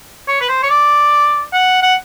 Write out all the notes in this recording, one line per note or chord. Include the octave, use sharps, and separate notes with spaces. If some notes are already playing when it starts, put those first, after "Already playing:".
C#5
B4
C5
C#5
D5
F#5
F#5